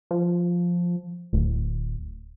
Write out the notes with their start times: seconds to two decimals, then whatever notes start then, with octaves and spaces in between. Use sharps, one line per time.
0.11 F3
1.33 D1